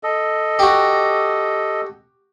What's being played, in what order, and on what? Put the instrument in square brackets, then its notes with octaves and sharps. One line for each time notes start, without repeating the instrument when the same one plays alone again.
[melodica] A4 D#5
[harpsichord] F#4 G4